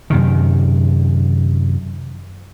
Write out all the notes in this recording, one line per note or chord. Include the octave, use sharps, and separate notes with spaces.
F#2 C3 D#3